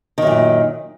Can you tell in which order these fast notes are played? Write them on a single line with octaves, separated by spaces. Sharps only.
D#3 F#2 A#2